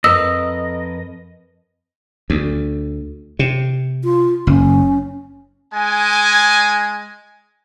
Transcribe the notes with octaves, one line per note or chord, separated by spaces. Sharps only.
F2 A#4 B4 D#5 E6
D2
C3
F4
F#1 C#4
G#3 G#5